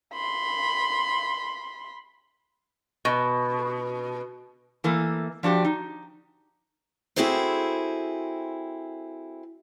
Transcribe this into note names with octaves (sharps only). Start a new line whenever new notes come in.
B5 C6
B2
E3 A3 A#3
F3 D4 F#4 G4
D#4
C4 E4 F#4 G#4 A4 C5